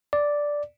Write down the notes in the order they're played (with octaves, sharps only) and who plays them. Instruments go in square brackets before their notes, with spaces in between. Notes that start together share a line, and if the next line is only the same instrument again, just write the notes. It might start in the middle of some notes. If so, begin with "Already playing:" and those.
[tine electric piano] D5